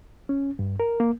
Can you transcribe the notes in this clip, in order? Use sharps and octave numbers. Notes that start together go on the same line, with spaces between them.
C#4
G2
A#4
A#3